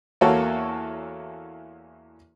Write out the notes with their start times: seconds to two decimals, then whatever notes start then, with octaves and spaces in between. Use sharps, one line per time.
0.21 E2 A#3 F#4 A4 C#5